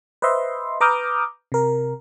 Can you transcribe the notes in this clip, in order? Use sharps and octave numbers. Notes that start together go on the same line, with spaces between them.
B4 C5 D#5 E5 C6
B4 A#5 D6 D#6 F6 G6
C3 A#4